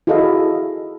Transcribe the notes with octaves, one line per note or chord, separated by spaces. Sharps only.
E4 F#4 G#4 A4 D#5 F5